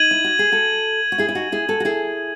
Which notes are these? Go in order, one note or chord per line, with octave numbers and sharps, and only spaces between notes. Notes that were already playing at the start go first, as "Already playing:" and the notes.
Already playing: D#4 G#6 D#7 F#7
E4
F#4
G#4
F#4 A4
F#4
E4 G#4
E4
D#4 F#4
E4 G#4
F#4 A4
F#4
E4 G#4